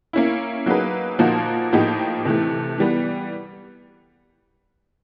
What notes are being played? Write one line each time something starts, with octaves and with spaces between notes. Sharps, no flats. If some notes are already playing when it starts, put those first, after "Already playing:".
A#3 C#4 E4
F#3 A#3 D#4 G#4 B4
A#2 F3 A#3 D#4 F#4
A2 F3 A#3 D#4 G4
C3 E3 A3
E3 G3 B3